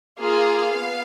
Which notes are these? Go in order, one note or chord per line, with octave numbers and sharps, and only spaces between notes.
A#3 F4 G#4 F5
B3